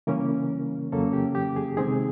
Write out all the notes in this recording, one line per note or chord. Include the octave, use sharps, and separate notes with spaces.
C#3 E3 G3 A#3 C#4 A#4
F2 C#3 F#3 A#3 C#4 A4
G4
G4
G#4
C3 D#3 G#3 C4 D#4 G#4